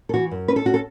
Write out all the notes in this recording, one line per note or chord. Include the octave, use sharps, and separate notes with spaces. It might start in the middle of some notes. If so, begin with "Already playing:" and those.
A4
E3 F#4
F#2
C#4 B4
A4
C#4 F#4
A4